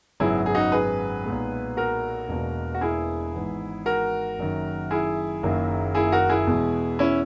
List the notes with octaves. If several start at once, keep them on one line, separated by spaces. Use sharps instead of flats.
G#1 F#2 C#3 F#3 B3 E4 G#4
G#4
D#4 F#4
G#4 B4
B1 A#2 G#3 B3
F#4 A#4
E1 E2 B2 A#3
F#4
E4 G#4
G#1 G#2 E3 B3
F#4 A#4
F#1 F#2 D#3
E4 G#4
F#1 F#2 D#3 F#3 A#3
E4 G#4
F#4 A#4
E4 G#4
E2 B2 G#3 B3
C#4 E4